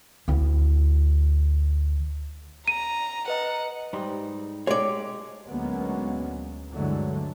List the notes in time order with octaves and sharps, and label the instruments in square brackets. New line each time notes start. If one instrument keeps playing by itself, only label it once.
[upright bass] D2 E4
[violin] A#5 [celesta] D#7
[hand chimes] B4 D#5 A#5 [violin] F#5
[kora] G#2 G3 D#4
[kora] G#3 G4 A4 [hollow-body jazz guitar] C#5 D5
[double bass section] D2 F#3 G#3 A#3 B3 C#4
G2 D3 E3 F#3 G#3 A3